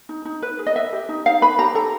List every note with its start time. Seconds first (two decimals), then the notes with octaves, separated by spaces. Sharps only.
0.09 D#4
0.25 D#4
0.42 B4
0.59 G#4
0.67 D#5
0.75 B4 E5
0.93 G4
1.09 D#4
1.26 D#4 F5
1.42 B4 B5
1.58 G4 A#5
1.75 A4 A#5